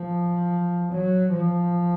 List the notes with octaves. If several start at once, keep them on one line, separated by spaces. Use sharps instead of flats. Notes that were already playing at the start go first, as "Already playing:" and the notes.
Already playing: F3
F#3
F3